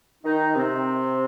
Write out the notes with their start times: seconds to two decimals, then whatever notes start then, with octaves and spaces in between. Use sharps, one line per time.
0.23 D#3 D#4
0.56 C3 C4